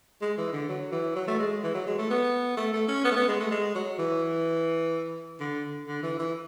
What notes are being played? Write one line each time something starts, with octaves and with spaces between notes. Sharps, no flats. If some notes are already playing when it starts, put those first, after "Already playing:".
G#3
E3
D3
F#3
E3
F#3
A3
G#3
E3
F#3
G#3
A3
B3
A3
A3
C#4
B3
A3
B3
G#3
A3
G#3
F#3
E3
D3
D3
E3
E3